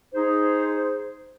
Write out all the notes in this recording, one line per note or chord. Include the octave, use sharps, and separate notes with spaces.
D#4 G#4 C5